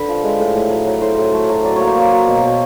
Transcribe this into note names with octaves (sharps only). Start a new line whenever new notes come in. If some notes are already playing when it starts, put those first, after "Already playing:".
Already playing: D3 B4
F3
G#3
A2
A2
F#3
F#3
A2 C5
A2
A3
F#3
F#3 D5
A#3 C#5
C5
A#3 C#5
F#3
B2
B2